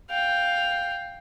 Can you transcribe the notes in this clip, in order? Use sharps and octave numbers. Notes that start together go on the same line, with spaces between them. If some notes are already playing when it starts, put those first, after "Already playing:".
F5 G5